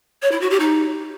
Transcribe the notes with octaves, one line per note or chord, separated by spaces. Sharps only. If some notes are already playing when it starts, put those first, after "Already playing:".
C#5
E4
F#4
G4
D#4